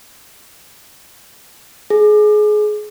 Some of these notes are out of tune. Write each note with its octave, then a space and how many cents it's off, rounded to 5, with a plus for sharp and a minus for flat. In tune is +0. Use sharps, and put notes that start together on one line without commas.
G#4 +25